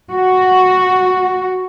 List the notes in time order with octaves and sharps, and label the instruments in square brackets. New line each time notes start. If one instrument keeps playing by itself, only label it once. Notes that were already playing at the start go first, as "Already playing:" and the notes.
[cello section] F#4